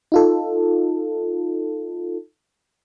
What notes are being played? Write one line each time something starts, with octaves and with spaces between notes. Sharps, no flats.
D#4 F4 A4